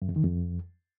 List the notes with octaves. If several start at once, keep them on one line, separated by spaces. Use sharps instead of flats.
F#2
F2
D#3
F2